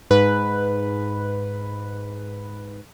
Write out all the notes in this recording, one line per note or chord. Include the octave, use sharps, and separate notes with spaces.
G#2 B4